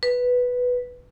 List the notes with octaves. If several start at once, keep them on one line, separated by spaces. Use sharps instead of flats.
B4